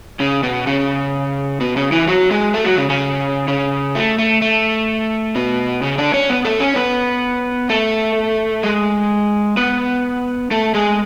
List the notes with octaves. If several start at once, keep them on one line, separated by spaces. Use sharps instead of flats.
C#3 C#4
B2 B3
C#3 C#4
B2 B3
C#3 C#4
E3 E4
F#3 F#4
G#3 G#4
A3 A4
F#3 F#4
C#3 C#4
C#3 C#4
C#3 C#4
A3
A3
A3
B2 B3
C#3 C#4
D3 D4
C#4 C#5
B3 B4
A3 A4
C#4 C#5
B3 B4
A3 A4
G#3 G#4
B3 B4
A3 A4
G#3 G#4